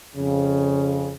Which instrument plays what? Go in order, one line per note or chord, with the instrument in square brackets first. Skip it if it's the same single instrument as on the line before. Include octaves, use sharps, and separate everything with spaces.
[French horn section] F2 C#3